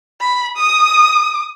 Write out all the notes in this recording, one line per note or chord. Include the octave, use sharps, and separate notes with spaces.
B5
D#6